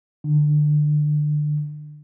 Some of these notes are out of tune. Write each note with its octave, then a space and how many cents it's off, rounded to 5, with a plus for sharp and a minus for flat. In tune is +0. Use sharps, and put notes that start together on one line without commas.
D3 +25